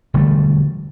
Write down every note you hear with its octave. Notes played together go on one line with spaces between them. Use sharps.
E1 D3 G3 A3